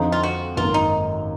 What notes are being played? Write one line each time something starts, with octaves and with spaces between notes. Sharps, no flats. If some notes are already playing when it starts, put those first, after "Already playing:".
Already playing: F2 D3 F3 D#4
F4
F#4
G#1 F#2 D#3 A#3 F4
D#4